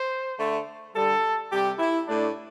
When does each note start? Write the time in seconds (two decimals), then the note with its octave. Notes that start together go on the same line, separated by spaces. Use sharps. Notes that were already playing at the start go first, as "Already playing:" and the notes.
Already playing: C5
0.37 D3 A3
0.94 D3 G3 A4
1.51 C3 G3 G4
1.79 E4
2.07 A2 A3 D4